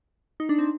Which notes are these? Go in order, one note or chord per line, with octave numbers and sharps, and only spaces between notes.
D#4
D4
C4